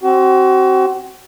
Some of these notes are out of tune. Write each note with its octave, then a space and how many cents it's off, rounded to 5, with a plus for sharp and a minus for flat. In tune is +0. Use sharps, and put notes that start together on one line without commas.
C4 +20 F#4 +35